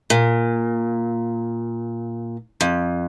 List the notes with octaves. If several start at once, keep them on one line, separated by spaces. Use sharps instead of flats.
A#2
F2